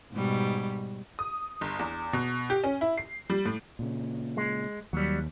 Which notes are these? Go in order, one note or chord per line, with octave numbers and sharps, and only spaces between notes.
G#2 B2 G3
D#6
G1
E2
B2
G4
C#4
E4
C7
G3
A2
A#2 C#3
G#3
D#2 F#3 G3